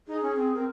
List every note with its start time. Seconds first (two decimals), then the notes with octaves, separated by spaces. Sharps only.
0.08 D#4 G#4
0.22 C#4
0.36 C4
0.55 C4 A#4